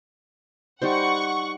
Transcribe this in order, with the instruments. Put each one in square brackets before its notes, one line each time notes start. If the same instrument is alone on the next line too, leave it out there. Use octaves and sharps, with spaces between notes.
[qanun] G3 D#4 C5 [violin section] F#5 C#6